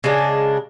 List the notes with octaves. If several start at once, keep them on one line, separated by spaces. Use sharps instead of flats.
C#3 G#3 D4